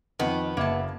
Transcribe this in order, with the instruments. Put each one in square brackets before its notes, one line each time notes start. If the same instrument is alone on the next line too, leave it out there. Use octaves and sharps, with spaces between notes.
[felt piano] F2 [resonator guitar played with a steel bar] D#3 [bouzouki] B3
[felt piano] F#1 E5 G#6 [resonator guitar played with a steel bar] A#3 A5